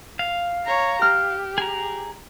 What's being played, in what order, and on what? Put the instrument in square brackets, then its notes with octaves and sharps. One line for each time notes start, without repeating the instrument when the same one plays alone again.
[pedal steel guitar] F5
[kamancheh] C#5 A#5
[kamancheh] G4 [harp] F6
[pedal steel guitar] G#4 A#5